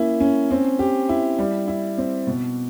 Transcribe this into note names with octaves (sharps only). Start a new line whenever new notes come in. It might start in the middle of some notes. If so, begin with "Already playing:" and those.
Already playing: A#3 C#4 E4
C#4
C4
G4
E4
G3
E4
C4
B2